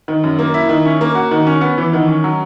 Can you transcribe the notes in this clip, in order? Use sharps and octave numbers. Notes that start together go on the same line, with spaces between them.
D#3
F#2
A#3
E4
D#3
C#4
A#3
F#4
D#3
C#4
B3
E3
D#3
C#4
F#3